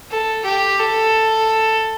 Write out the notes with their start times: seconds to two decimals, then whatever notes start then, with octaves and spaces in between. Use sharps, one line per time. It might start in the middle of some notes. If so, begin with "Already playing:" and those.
0.11 A4
0.45 G4
0.79 A4